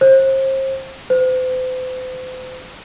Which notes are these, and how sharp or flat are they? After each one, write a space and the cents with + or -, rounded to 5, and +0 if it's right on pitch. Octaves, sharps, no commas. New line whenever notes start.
C5 +35
C5 -40